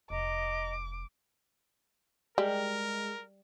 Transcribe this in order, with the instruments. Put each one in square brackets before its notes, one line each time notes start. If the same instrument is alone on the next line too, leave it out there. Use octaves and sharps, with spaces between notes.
[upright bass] F1 [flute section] D#5 A#5 [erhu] D6
[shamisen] G3 [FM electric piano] G#3 [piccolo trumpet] A#4